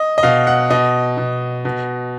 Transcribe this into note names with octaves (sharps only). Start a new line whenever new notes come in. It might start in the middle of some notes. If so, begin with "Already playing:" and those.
Already playing: D#5
D#5
B2 F5
F#5
B2 D#5
B2
B2